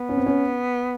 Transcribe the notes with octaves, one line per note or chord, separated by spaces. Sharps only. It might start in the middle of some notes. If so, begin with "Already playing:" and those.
Already playing: B3
C#4
C4
C#4